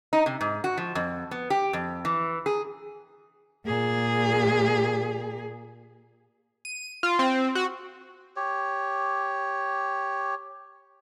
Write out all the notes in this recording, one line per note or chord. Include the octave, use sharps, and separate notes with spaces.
D#4
C3
G#2
F#4
F3
F2
B3
G4
F2
E3
G#4
A#2 G#4
D#7
F4
C4
F#4
G4 C#5